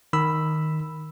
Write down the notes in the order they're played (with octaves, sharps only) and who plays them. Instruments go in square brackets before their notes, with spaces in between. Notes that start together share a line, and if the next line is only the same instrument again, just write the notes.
[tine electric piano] D#3 B5 E6